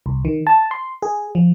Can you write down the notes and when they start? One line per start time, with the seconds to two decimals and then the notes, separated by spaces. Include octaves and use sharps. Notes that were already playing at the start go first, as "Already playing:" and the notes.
0.06 C2
0.25 D#3
0.47 A5
0.71 C6
1.02 G#4
1.35 F3